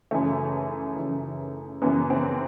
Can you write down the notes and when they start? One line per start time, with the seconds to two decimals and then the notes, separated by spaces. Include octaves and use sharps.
0.11 F#2 C#3 E3 A3
0.96 F#2 C#3 E3
1.82 F#2 C#3 E3 B3
2.10 C4